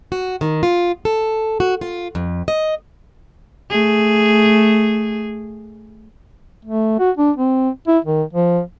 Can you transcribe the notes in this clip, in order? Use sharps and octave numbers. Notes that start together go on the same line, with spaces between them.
F#4
D#3
F4
A4
F#4
F4
F2
D#5
A3 G#4
A3
F#4
D4
C4
E4
D#3
F3